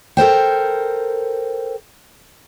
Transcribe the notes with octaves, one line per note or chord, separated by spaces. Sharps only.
A4 A#4 C5 G5